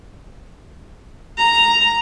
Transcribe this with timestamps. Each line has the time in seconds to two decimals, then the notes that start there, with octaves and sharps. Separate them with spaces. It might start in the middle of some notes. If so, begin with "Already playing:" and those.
1.38 A#5